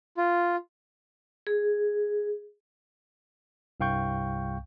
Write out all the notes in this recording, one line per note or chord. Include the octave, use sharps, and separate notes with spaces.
F4
G#4
C2 G2 F5 G5 C#6 G6